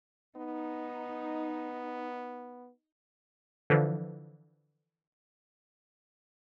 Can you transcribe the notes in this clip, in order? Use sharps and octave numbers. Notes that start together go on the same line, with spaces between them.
B3 D#4
D3 E3 F3